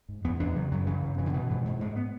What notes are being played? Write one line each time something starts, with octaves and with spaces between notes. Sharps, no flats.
G#2
E2 B3
E2 D4
C#3 F#3
F#2 F#3
C#3 E3
F#2
B2 E3
D3
B2 E3
G#2 E3
G#2
G#2 G#3
B3